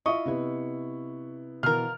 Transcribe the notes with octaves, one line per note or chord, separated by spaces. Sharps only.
E4 F4 D#5 E5 C#6
C3 B3 E4
B2 E3 F4 A#4 F6